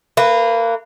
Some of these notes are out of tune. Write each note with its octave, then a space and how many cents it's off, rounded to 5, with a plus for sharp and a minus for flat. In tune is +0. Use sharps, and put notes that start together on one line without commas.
A#3 -25 B4 +0